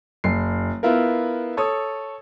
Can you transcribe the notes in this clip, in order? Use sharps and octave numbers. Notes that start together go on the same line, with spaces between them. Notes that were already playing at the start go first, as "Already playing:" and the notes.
F#1 C7
B3 E4 F4 A#4
A4 C#5 D#6